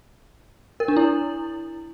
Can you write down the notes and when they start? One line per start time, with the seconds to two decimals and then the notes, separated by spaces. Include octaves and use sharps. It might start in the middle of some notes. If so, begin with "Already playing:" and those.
0.80 A#4
0.88 D4
0.97 E4